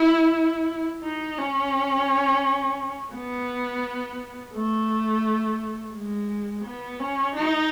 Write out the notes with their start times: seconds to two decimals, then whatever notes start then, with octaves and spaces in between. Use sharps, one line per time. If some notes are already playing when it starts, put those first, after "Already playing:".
Already playing: E4
1.03 D#4
1.38 C#4
3.14 B3
4.54 A3
5.95 G#3
6.65 B3
7.00 C#4
7.35 D#4